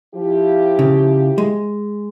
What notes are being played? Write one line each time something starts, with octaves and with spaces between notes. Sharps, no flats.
F3 E4 G4
C#3
G#3